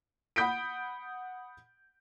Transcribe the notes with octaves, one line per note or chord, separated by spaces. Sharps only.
F#5 B5 D#6 G6 B6 D7